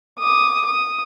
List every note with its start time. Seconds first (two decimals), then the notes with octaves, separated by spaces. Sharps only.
0.19 D6 D#6
0.66 D#6